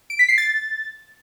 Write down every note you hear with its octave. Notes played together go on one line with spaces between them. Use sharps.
D7
B6
C7
A6